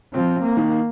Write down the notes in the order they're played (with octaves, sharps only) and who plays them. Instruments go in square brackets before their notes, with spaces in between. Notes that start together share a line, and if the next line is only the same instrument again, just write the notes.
[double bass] F3 [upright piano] C4
[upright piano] C4
[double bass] A#3
[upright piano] D#3